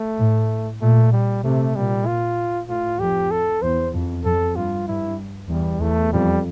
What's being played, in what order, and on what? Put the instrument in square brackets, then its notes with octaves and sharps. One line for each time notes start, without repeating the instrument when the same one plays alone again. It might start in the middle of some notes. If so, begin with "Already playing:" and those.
Already playing: [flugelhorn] A3
[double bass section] A2
[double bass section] A#2 [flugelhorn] A3
[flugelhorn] G3
[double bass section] C3 [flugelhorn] A3
[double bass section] A#2 [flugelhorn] G3
[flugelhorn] F4
[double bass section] A2 [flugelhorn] F4
[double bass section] F2 [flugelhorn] G4
[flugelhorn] A4
[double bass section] E2 [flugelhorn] C5
[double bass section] F2
[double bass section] F2 [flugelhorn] A4
[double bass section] G2 [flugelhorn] F4
[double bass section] G2 [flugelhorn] E4
[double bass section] E2 [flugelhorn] G3
[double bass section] E2 [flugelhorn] A3
[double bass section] F2 [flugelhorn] G3